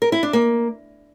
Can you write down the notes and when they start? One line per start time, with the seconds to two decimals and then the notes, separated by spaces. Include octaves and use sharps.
0.02 A#4
0.12 E4
0.23 D4
0.33 A#3